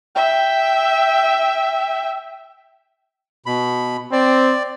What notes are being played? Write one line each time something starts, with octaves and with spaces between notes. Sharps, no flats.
E5 G5
B2 B5
C4 D5